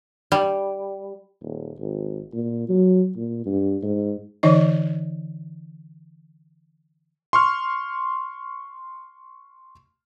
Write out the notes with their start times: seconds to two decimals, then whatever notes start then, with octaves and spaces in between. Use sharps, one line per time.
0.32 G3
1.42 D#1
1.79 G#1
2.34 A#2
2.69 F#3
3.16 A#2
3.46 G2
3.83 G#2
4.43 D3 E3 D#4 D#5
7.33 C6 C#6 F6